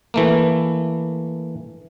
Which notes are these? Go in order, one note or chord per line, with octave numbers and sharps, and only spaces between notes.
E3 A3 A#3